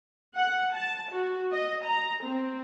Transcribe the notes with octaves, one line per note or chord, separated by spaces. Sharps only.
F#5
A5
F#4
D#5
A#5
C4